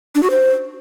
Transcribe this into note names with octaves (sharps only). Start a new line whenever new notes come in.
D4
F#4
C5